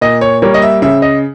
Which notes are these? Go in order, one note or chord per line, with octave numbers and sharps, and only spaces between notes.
A#2 D#5
C#5
G3 A#3 C#5
D#5
E5
C#3 E5
D#5